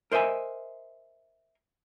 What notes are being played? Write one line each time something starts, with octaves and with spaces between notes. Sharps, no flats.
A#4 C5 D#5 E5 G#5